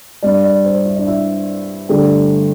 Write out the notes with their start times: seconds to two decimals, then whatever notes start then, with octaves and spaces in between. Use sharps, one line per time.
0.22 G2 G3 D5
0.44 D5
0.65 C5
0.85 E4
0.96 D4
1.07 E4
1.89 G2 D3 A3 G4